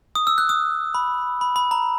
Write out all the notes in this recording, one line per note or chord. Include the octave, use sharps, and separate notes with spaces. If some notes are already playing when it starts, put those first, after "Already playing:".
D#6
E6
F#6
D#6
B5
B5
B5
A#5